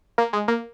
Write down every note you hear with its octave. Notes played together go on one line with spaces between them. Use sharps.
A#3
G#3
A#3